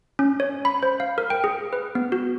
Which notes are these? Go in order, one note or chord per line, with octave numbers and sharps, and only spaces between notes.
C#4
C#5
B5
C5
F5
A#4
G5
G#4
B4
B3
F#4